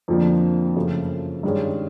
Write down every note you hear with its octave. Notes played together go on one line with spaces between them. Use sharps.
F2 D3 F3 A#3 D4
F#2 C#3 F3 A3
G2 D#3 G#3 C#4